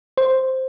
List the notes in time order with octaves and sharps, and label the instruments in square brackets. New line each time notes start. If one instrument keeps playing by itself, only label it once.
[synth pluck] C5